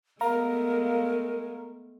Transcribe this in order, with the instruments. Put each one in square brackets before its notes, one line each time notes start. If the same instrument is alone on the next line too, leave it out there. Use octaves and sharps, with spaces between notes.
[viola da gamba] G#3 A3 B3 [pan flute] A#4 [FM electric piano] F5 A#5